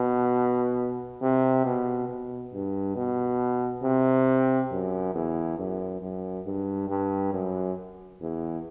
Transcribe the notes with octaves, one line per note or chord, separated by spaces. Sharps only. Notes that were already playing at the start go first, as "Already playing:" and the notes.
Already playing: B2
C3
B2
B2
G2
B2
C3
F#2
E2
F#2
F#2
G2
G2
F#2
E2